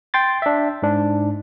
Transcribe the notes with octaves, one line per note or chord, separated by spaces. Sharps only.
G5 C6 A6
D4 E5
G#2 D4